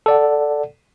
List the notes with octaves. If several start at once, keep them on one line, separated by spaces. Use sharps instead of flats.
A4 D5 F#5